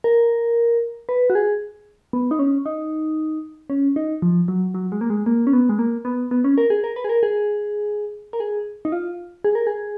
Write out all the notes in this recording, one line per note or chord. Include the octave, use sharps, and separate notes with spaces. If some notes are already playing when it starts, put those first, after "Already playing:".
A#4
B4
F#4
G#4
B3
D#4
C#4
D#4
C#4
D#4
F3
F#3
F#3
G#3
A#3
G#3
A#3
C#4
B3
G#3
A#3
B3
B3
C#4
A#4
G#4
A#4
B4
G#4
A#4
G#4
A#4
G#4
D#4
F4
G#4
A#4
G#4